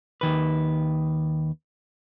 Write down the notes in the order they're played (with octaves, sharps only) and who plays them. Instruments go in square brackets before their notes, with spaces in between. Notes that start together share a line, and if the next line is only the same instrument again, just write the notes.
[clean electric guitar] D#2 D#3 B4